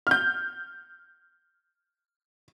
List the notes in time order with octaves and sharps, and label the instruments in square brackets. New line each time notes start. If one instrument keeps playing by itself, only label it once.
[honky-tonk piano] F6 G6